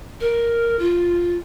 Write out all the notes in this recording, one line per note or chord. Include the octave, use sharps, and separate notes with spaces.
A#4
F4